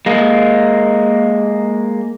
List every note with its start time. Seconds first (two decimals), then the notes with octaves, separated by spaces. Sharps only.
0.06 G#3 A#3